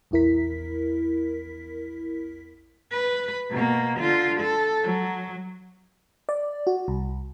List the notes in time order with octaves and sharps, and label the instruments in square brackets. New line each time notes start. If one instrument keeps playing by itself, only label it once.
[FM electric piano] A#1 E2 E4 A#4 B6
[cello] B4
B2 A#3
D3 F4
A4
F#3
[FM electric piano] D5
F#4
C2